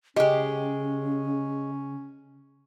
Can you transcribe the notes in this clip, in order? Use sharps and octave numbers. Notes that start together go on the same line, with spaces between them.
C#3 G#3 C#4 G4 D#5